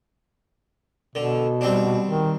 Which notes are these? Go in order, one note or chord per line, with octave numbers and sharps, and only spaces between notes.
B2 D3
G3 C4 D4
D#3